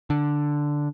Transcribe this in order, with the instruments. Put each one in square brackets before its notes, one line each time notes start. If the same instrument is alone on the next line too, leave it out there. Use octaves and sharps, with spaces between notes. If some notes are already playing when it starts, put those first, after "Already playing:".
[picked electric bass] D3